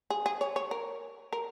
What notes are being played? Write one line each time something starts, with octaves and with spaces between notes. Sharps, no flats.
G#4
G#4
C#5
C#5
A#4
A#4